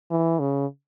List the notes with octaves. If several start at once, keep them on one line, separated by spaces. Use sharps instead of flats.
E3
C#3